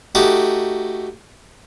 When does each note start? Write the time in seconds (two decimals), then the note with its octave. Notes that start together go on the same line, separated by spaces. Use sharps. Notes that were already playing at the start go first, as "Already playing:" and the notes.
0.15 A3 D#4 F#4 G4